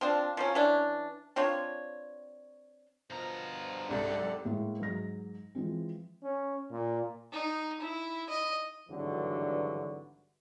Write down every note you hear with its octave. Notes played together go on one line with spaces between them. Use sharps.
F3 C4 D4
F3 F#3 C#4
E3 C#4 D4
C4 D4 F4 C#5
G2 B2 F3 A#4 A#5
C2 G#2 G4 A4 D5 F#5
A2 G#3 A#3
G#2 F#3 A#6
E3 F3 G#3 C4
C#4
A#2
D#4
E4
D#5
G#1 G2 D3 E3 F#3 F#4